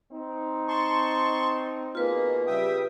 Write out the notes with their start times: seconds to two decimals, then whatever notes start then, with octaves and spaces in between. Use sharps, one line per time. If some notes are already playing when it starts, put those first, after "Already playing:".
0.12 C4 D#4
0.68 A5 C6 C#6
1.95 B2 G#3 A#3 F4 B4
2.47 C#3 G3 E5 G5 D#6